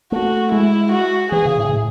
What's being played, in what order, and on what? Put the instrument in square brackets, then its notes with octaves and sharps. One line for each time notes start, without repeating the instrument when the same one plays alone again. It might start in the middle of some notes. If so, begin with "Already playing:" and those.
[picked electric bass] A3 [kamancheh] F#4
[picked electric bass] G#3 [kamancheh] E4
[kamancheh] F#4
[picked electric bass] E3 [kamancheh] G#4
[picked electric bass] C#3
A2
A2